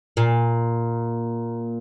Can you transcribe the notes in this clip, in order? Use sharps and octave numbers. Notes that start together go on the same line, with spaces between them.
A#2